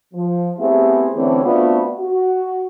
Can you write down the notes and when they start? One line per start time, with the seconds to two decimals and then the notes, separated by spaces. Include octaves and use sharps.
0.13 F3
0.58 A3 B3 C4 E4 G4 G#4
1.14 D3 E3 A3 C4 C#4 G#4
1.44 A3 B3 C4 D4 F4 F#4
1.99 F#4